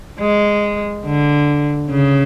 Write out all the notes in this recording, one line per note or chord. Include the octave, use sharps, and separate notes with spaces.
G#3
D3
C#3